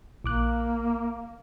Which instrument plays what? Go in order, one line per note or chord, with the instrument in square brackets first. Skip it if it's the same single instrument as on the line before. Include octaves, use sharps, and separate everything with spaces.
[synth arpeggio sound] A#1 D6 F#6 [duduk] A#3